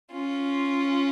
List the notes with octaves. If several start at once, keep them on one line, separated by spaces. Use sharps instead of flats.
C#4 F4